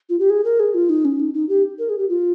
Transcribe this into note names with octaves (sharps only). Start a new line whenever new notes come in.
F4
G4
G#4
A#4
G#4
F4
D#4
C#4
D#4
D#4
G4
A#4
G#4
G4
F4